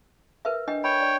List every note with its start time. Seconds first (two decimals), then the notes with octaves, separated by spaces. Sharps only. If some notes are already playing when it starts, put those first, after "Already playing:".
0.45 A#4 B4 E5
0.68 D4 D#5 G5
0.84 C#5 G5 B5
1.01 D5